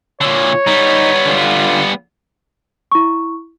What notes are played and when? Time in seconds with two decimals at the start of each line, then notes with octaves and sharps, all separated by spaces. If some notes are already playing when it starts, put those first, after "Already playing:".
0.21 A#2 D3 C#5
0.67 G3 B3 D#4
1.26 D3 F4
2.92 E4 C#6